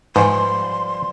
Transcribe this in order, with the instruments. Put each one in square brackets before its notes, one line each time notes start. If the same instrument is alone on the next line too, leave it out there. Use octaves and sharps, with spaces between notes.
[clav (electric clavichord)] G#2 [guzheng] F3 G3 [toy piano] B4 G#5 [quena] C6